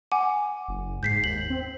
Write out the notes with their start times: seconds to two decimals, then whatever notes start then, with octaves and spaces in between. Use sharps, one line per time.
0.12 F#5 G#5 D6
0.68 F#1
1.03 G#2 G6 B6 C7
1.24 D#2 F#7
1.50 C4